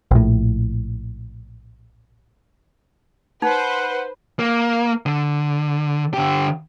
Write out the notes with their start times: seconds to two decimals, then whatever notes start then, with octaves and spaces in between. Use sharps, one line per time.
0.11 A#1 A2
3.42 D#4 B4 C5 F#5
4.39 A#3
5.06 D3
6.14 D3 G4